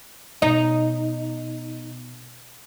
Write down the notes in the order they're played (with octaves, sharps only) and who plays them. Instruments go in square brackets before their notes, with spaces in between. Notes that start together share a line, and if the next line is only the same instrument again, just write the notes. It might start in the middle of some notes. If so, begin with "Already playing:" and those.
[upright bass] B2 [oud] D#4